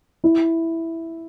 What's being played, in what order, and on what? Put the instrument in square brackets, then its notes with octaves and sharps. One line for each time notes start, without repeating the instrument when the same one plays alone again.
[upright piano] E4